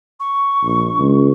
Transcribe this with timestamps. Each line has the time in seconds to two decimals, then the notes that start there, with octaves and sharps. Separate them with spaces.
0.20 C#6
0.63 A#1
0.99 C#2